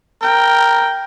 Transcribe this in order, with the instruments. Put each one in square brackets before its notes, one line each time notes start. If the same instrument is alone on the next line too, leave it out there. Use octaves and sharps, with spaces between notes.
[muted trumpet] A#4 [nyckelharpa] G5